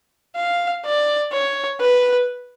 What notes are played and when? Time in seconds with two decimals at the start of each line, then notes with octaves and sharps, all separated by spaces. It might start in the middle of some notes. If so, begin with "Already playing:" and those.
0.36 F5
0.85 D5
1.32 C#5
1.80 B4